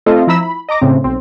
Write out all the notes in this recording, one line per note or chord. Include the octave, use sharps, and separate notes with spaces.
A3 C4 F4 A4 D#5 F5
F3 E4 A#5 B5 E6 B6
B5
D#5 A#5 D6 A#6
A2 C#3 C4
B1 C4